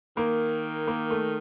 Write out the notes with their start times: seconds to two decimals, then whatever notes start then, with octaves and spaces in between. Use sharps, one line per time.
0.17 D#3 A#3
0.87 A#3
1.11 A3